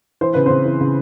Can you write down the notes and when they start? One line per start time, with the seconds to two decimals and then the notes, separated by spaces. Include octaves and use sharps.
0.21 E3 C5
0.34 C#3 B4
0.46 C#3 C4 C5
0.65 E3
0.81 C#3